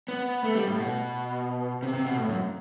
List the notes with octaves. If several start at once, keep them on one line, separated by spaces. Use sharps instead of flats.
B3
A3
G3
A2
B2
C3
C3
B2
A2
F#2